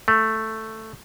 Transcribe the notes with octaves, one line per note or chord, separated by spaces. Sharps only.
A3